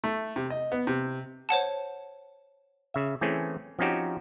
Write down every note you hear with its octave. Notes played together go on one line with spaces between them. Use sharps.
A3
C3
D#5
B3
C3
C5 C#5 F#5 A5
C#3 E5
E3 A3 C4 C#4 G#4
F3 C4 C#4 D#4 F#4 G4